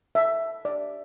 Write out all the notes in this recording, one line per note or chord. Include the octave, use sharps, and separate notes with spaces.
E5
D5